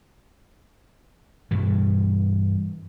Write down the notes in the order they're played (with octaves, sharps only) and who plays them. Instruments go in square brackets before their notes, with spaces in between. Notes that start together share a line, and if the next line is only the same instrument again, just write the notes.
[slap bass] G2 B2 E3